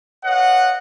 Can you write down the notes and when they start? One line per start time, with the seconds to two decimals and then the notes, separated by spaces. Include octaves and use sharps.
0.24 B4 C#5 D#5 F5 F#5